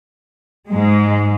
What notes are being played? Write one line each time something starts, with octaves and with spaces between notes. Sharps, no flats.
G#2 G#3